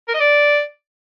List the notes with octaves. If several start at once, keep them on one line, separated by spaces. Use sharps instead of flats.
A#4
D#5
D5